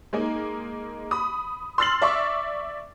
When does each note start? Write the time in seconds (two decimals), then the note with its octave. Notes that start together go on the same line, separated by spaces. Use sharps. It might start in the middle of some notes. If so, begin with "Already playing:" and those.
0.13 G#3 A#3 D#4
1.11 B5 D#6
1.78 C6 E6 F6 A6 C7 F#7
2.02 D5 E5 C#6 E6